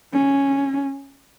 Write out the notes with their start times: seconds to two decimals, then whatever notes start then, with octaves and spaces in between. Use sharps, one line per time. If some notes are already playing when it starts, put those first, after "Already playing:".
0.13 C#4